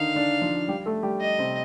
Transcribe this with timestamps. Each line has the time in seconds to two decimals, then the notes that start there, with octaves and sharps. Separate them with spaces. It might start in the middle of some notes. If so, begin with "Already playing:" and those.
Already playing: D3 D#3 D4 D#4 F5
0.15 D3 D4
0.41 F3 F4
0.68 G3 G4
0.86 A3 A4
1.03 G3 G4
1.21 D#5
1.38 C3 C4